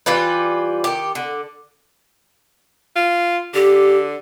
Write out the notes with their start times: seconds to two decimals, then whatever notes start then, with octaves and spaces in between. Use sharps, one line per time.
0.06 E3 G3 F4 B4
0.84 D#3 G4
1.15 D3
2.96 F4
3.54 D3 G4